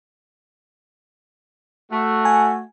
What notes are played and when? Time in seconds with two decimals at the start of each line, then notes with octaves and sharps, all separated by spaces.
1.90 A3 F#4
2.25 G#5